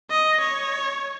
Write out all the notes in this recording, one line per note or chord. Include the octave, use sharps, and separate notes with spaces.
D#5
C#5